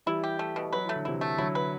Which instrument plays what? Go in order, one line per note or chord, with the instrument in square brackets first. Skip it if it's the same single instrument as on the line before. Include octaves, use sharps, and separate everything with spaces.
[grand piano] E3 G3 [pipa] E4
[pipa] G4
A3
B2
[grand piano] F#3 [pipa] B4
[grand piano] E3 [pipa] A3
[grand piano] D3
[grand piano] C3 E3 [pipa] E4
[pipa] A3
[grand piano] D3 F#3 [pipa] E4
[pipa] B4